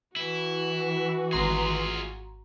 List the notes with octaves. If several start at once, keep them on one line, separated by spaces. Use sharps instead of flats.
E3 E4 F#4
G#1 F4 G#4 A#5 C6